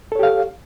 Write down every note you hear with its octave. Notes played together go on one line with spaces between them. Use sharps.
G4 A4 C#5 F5